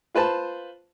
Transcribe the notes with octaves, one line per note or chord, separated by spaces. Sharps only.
F4 B4 C5 A5